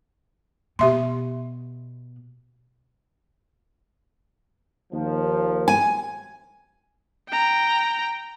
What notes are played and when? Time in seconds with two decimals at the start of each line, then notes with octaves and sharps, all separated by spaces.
0.79 B2 G4 E5 C6
4.92 D#2 F3
5.68 G#5
7.30 G5 A#5